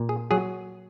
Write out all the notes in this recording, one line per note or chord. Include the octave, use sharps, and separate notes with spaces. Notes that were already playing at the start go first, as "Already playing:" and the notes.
Already playing: A#2
G#4
F#3 G#4